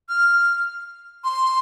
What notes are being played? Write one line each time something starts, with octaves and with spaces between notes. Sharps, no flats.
F6
C6